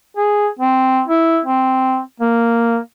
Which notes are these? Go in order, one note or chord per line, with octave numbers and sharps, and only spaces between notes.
G#4
C4
E4
C4
A#3